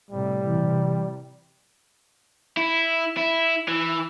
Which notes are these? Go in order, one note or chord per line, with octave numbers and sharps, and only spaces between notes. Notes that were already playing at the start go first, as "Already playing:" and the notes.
A2 C3 G3
C3 E3
E4
E4
E3